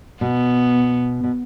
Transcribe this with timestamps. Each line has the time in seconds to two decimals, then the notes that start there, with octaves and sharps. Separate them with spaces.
0.21 B2 B3
1.24 B2